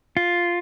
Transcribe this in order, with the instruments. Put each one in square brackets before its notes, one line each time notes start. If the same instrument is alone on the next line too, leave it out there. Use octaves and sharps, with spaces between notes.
[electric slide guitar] F4